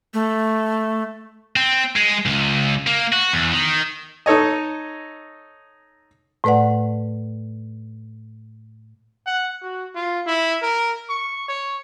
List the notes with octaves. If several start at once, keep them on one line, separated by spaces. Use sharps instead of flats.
A3
C4
G#3
C#2
A#3
F#4
E2
D#3
D#4 A4 C#5 D#5
A2 A3 B4 D5 F#5
F#5
F#4
F4
E4
A#4
C#6
C#5